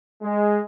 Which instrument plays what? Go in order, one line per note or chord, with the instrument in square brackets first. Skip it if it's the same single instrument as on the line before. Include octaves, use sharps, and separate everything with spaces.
[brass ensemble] G#3